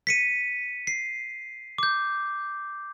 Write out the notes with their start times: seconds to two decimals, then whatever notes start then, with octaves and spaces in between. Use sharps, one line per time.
0.07 B6 C#7 D#7
0.87 C7
1.78 D6 G6